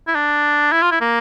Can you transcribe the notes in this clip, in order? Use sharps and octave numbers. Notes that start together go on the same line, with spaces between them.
E4
D4
E4
F4
E4
A#3